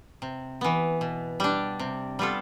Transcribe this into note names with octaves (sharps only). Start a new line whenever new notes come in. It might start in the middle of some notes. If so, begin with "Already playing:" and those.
C3
E3 B3
B2
G3 D4
C3
G3 B3 F4 A4